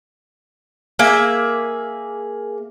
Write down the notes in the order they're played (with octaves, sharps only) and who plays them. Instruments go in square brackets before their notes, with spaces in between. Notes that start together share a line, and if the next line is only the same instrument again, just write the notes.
[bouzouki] A#3 G#4 E5